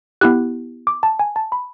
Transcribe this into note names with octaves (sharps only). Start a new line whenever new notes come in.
B3 E4 G4 F#6
D6
A5
G#5
A5
B5